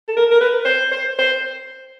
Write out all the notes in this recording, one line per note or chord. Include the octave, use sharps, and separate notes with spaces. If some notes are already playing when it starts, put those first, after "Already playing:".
A4
A#4
A#4
B4
C5
C5
C5